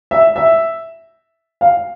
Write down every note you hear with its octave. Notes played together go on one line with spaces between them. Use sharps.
E5
E5
F5